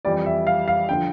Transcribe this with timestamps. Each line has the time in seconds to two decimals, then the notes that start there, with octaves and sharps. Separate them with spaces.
0.05 F2 E3 G3 D5
0.26 E5
0.47 F5
0.68 F5
0.89 D3 F3 G5